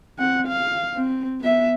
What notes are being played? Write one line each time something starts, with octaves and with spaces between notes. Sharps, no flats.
C4 F#5
F5
C4
B3 E5